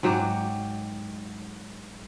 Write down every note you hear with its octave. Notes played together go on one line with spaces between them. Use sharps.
G#2 F#3 G4